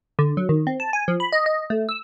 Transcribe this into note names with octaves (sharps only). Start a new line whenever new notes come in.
D3
F#3
D#3
C4
A5
G#5
F3
B5
D#5
D#5
A3
E6